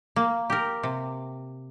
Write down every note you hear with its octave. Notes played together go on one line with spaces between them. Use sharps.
A#3
G4 A#4
C3